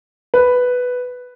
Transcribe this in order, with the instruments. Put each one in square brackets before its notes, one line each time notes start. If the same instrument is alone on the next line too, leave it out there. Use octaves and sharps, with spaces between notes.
[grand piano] B4